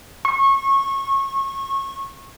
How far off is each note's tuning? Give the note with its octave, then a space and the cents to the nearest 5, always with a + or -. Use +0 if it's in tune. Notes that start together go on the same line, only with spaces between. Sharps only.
C#6 -25